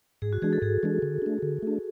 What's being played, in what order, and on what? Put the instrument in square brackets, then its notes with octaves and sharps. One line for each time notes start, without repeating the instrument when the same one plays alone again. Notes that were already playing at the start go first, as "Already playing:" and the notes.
[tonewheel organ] G#2 [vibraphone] G#4
[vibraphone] F#4
[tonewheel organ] E3 G#3 D4 [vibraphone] G#4
[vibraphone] A4
[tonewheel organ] G#2 [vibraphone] G#4
[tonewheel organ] E3 G#3 D4
D3
A3 D4
D3
A3 D4